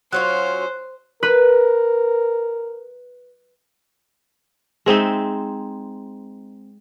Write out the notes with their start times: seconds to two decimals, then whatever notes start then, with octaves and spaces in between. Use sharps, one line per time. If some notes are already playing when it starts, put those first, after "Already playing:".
0.13 F#3 C#4 F4 C5 F#6
1.23 A#4 B4
4.86 G#3 C4 D#4 E5